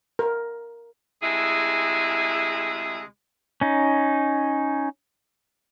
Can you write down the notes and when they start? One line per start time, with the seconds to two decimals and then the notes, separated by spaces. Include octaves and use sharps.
0.19 A#4
1.23 D2 C3 G#3 E4 G#4
3.61 C#4 D#4